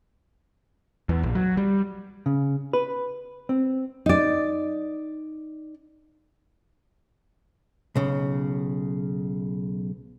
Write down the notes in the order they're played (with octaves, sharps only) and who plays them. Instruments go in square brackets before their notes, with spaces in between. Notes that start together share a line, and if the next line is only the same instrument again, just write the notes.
[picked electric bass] E2
A#1
F#3
G3
[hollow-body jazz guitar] C#3
B4
C4
[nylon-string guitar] D#4 D5
[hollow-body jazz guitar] B1 C#3